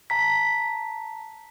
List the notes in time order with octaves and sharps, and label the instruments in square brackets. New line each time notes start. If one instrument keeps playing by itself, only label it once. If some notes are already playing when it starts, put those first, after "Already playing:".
[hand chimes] A5 A#5 B6